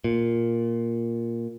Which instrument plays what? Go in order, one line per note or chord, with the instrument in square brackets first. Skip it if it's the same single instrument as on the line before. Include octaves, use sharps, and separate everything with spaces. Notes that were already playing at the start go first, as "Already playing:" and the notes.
[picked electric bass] A#2